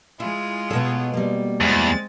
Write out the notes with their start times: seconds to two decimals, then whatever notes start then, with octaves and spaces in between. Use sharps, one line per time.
0.20 G#3 E4 F4 G#4
0.71 B2 B3 A4 C#5
1.14 G3 A#3
1.61 E2 G#3 C4 A6